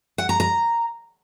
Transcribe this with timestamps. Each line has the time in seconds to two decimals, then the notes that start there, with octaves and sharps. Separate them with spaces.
0.18 F#5
0.29 A#5
0.40 A#5